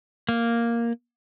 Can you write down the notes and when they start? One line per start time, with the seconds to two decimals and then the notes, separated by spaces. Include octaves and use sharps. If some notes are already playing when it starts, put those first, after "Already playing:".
0.29 A#3